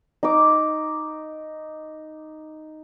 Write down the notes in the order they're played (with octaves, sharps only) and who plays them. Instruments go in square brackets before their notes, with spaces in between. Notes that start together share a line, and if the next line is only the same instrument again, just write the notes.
[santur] D#4 D6